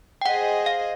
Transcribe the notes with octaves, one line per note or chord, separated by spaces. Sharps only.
G5
G#4 C5 D#5 F#5
F5